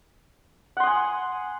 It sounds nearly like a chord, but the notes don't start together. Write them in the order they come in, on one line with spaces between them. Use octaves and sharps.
F#5 C6 D#6 G#5